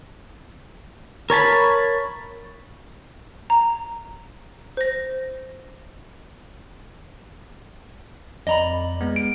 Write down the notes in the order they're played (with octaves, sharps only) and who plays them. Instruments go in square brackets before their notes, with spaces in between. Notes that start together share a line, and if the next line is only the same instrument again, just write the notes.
[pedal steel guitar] A#4 C#5 A5 B5
[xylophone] A#5
C5 A#6
[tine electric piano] F2 D5 [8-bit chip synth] D#5 A#5 B5
[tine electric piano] G#3 B3
[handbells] D7